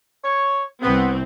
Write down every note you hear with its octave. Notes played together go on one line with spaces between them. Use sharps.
C#5
C2 B3 C4